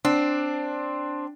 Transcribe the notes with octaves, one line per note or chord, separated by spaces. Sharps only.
C4 D4